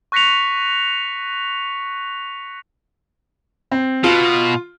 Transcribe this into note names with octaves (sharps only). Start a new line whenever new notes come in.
C#6 F#6 A#6 B6 C#7 F7
C4
B2 F4